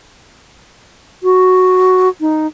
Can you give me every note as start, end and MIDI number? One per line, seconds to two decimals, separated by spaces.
1.23 2.08 66
2.20 2.47 63